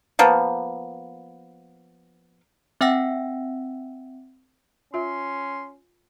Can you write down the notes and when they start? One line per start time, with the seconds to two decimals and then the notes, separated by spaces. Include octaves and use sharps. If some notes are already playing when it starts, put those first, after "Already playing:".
0.19 F3 A#3 B3
2.81 C4 E5 F#5 G5 E6 A#6
4.94 C#4 F4 E5 C6